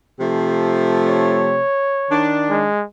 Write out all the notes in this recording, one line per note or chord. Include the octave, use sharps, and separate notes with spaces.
C3 F3 A3
C#5
D#3 D4
G#3